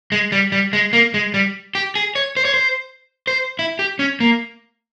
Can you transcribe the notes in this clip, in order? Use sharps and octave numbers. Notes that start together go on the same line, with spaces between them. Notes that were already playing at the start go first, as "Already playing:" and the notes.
G#3
G3
G3
G#3
A#3
G#3
G3
G4
G#4
C#5
C5
C#5
C5
C5
E4
G4
C#4
A#3